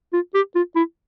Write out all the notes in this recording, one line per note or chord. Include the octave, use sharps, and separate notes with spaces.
F4
G4
F4
E4